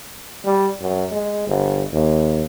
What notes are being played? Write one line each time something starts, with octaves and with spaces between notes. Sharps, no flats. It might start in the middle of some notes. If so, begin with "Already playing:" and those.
G3
F#2
G#3
G1
D#2